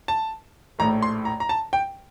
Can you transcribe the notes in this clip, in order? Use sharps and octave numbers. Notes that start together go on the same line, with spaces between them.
A5
A#1 A2 A3 A#5
C6
A#5
A#5
A5
G5